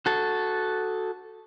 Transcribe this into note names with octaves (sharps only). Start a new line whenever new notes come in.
F#4 A4